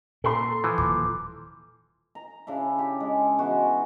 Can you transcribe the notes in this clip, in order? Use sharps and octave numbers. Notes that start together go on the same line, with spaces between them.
A#2 A4 A#5 C6
E3 F3
D#1 D6
A#5
C#3 D4 E4
G4
G#3
E3 G#3 B3 F#4